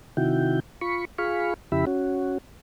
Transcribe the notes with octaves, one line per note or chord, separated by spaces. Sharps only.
C3 D#3 E4 F#4 G5
F4 B5 C#6
F4 G#4 F5 B5 C#6
F2 C#3 E4 G4 E5 B5
C#4 F#4